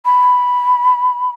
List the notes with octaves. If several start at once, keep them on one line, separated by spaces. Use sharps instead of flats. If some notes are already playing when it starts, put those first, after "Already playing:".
B5